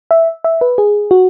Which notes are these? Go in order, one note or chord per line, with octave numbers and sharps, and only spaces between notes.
E5
E5
B4
G#4
F#4